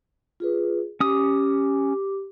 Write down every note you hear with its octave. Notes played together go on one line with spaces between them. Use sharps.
F4 G#4 B4
C#4 G4 D6 D#6